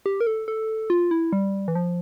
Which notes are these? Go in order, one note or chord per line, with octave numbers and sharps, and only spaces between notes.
G4
A#4
A4
A4
F4
E4
G3
E3
F3